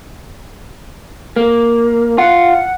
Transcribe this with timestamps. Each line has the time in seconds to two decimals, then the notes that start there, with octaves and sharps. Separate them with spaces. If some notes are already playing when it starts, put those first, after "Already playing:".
1.36 A#3
2.18 F4 F#5